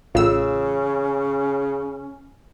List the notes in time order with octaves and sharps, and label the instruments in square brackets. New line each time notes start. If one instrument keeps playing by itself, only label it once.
[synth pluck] A1 E6 [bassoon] C#3 [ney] C#4 [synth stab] F4